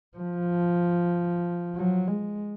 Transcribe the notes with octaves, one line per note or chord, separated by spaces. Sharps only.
F3
F#3
G#3